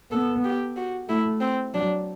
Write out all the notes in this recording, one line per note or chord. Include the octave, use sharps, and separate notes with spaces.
B3 A4
G4
F#4
A3 E4
C4
F#3 D4